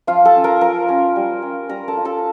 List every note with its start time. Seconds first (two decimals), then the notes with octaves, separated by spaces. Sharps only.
0.07 F3 F4 F5
0.25 A4 A5
0.35 C#4 F4
0.44 A#4 A#5
0.61 F3 A#4 A#5
0.88 C#4 F4
1.16 G3
1.42 C#4 F4
1.69 G3 A#4 A#5
1.88 A4 A5
1.97 C#4 F4
2.05 A4 A5